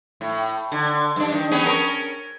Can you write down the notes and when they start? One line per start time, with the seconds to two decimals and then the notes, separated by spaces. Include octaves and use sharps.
0.21 A2
0.72 D3
1.16 G2 D4
1.32 D#3
1.51 B3 C#4 G#4
1.66 C#4 A#4